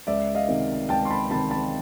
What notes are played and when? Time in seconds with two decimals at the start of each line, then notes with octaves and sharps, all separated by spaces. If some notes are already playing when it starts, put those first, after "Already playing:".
0.07 C#2 D5 E5
0.34 D#5 F5
0.48 C3 D#3
0.89 C#2 G5 A5
1.05 C6
1.10 A5 B5
1.30 C3 D#3 A5 B5
1.51 A5 B5